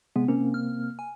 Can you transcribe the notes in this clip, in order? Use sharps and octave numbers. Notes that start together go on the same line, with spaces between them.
C3 G#3 B3
C3 A#3 C4 C#4
F6
G#5